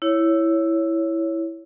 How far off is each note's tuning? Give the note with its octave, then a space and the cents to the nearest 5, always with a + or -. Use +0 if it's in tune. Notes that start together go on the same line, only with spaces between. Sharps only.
E4 +0 C#5 +0